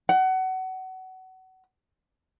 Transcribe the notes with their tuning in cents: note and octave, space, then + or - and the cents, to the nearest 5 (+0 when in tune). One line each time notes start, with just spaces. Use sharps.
F#5 +25